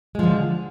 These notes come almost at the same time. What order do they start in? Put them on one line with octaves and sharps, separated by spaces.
G#3 F3 D3